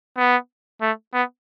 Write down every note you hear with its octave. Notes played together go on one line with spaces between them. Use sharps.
B3
A3
B3